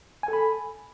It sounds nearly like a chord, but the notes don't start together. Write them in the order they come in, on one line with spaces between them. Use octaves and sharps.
G#5 A4 B5